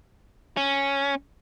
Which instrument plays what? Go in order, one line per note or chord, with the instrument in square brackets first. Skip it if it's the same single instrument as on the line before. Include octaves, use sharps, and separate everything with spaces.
[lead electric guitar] C#4